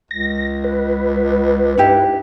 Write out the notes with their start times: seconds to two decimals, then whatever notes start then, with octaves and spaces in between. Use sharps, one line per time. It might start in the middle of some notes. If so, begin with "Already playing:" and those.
0.11 C#2 A#6
0.64 B4
1.77 G2 D#4 E4 G4